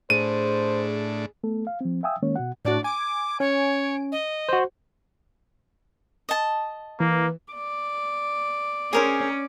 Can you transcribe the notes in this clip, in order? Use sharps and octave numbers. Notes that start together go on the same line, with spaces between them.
A2 D4 G#4 C5 D#7
A3 B3 A4
F5
F3 C4
E5 F5 G5 G#5 D#6 E6
D#3 G#3 A#3 C#4 C#5
B2 F#4 F#5
A2 D4 F#4 D5
G#5 D6 D7
C#4 C#5
D#5
F#4 C5
D#5 A5
E3 A#3
D5
C#4 G#4 A#4 C5